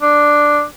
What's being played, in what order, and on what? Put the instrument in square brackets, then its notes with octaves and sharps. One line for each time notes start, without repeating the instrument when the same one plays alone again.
[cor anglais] D4